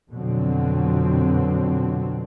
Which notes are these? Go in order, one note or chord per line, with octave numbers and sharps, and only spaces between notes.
F2 B2 D3 F#3 C4